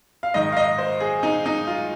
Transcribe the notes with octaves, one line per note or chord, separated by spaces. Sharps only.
F5
G#2 D#3 D#5
F5
D#5
C5
G#4
D#4
D#4
F4